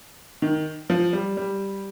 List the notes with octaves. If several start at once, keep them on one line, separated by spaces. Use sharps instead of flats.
D#3
F3
G3
G3